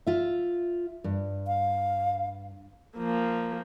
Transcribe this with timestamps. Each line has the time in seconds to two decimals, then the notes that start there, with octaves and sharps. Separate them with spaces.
0.07 F4 E5
1.04 G2
1.47 F5
2.97 F3 A#3